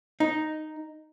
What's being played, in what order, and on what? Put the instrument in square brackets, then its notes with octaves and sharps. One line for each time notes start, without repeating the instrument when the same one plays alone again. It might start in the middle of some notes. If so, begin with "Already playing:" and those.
[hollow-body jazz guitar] D#4